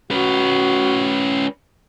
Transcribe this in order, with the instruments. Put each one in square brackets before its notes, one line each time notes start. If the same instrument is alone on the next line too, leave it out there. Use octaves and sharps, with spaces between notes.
[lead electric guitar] C#4 B4 [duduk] F#4